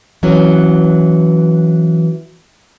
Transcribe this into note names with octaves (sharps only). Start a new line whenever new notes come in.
E3 F#3 B3 C#4